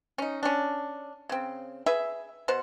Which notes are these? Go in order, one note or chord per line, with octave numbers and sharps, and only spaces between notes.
C#4 D#4
C#4 D4
C#3 C4
G#4 B4 E5
B2 C5 F#5